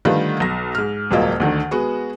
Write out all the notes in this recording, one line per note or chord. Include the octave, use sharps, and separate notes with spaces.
D3 D#3 G3 A3 F4 B4
B1 A#6
G#2 F6
D#1 C#2 F#3 A#3 F4 D#5
D2 D3 D#3
G#3 B3 F#4